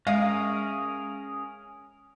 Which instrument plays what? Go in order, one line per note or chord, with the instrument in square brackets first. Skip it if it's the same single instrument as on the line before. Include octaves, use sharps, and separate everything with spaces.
[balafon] G#3 D#5 [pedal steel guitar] C#4 G#4 A#4 [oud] F5